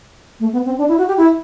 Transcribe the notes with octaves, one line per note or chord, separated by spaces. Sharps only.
A3
B3
C4
D4
E4
F#4
G4
E4